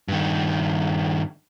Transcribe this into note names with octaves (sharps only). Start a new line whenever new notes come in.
G2 D#3